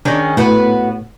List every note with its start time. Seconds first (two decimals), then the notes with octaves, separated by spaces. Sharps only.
0.05 D#3 G#3 C#4 D4
0.37 A2 B3 F#4 B4